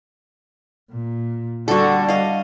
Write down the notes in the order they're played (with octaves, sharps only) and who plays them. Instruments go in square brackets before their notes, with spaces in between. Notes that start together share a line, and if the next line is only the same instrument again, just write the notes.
[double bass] A#2
[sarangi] D3 [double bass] G3 [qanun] F#4 A4
[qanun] D#5 F5